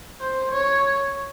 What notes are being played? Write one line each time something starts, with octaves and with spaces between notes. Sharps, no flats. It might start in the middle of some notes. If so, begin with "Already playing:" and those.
C5
C#5